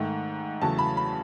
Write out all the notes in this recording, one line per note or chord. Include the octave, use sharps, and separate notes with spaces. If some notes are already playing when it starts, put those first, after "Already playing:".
Already playing: G#2 D#3 A3
E2 C#3 F#3 A3 A5
B5
B5